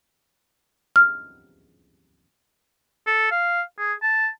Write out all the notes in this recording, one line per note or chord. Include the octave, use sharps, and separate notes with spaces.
F6
A4
F5
G#4
A5